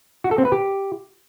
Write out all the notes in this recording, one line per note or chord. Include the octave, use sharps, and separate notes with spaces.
F#4
A4
C4
B4
G4